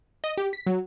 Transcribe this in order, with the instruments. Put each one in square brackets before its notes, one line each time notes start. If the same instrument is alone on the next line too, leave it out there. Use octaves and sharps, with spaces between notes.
[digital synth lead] D#5
G4
B6
F#3